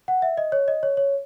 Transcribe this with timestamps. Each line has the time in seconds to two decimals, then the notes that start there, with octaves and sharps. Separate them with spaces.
0.08 F#5
0.22 E5
0.37 D#5
0.52 C#5
0.68 D#5
0.83 C#5
0.97 C#5